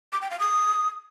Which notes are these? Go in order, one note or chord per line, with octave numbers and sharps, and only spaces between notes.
D6
G5
F5
D#6